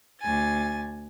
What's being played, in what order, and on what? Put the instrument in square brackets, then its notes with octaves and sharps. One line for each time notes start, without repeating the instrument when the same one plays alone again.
[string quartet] D2 G#5 A6